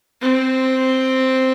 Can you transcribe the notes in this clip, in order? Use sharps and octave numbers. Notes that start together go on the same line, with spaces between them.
C4